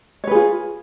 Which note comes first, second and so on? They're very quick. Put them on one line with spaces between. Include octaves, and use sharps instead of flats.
C#5 B4 G#4 F4